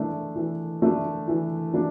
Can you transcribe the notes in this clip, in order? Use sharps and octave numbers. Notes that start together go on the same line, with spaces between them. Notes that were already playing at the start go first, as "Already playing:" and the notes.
Already playing: E3 A3 D4
E3
A3 D4
E3
A3 D4